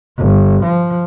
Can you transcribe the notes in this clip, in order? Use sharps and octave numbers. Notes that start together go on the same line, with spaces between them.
G1
F3